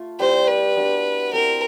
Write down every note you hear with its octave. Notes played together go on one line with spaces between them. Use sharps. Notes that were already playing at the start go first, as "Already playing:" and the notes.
Already playing: A3 F4
G3 C4 E4 C5
B4
B3 D4 F#4
C4 E4 A4 A#4 D5